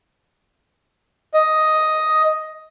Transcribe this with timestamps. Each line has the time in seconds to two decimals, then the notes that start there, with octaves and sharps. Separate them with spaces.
1.34 D#5